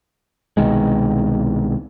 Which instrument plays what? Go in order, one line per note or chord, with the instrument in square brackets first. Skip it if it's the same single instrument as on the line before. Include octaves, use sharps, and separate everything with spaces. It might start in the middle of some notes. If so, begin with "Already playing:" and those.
[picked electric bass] C2 B2 D#3 G#3